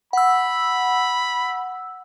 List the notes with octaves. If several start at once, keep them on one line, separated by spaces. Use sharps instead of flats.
F#5 B5 E6